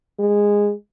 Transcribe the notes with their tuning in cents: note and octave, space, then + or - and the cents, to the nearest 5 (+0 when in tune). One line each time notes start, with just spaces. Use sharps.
G#3 -15